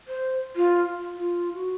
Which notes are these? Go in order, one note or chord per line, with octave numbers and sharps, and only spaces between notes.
C5
F4
F4
F#4